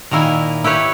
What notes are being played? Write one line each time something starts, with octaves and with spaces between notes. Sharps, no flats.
A#2 D#3 A#3 E4 G#5
E4 G4 B4 C#5